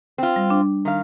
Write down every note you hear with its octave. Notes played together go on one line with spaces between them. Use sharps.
C4 F4
G3
D4
D#3 F5